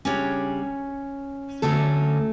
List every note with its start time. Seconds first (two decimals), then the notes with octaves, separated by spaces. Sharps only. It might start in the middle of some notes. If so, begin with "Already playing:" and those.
0.05 C#3 G3 C#4 D4 C#5
1.62 D2 D3 F#3 A3 C#4 A4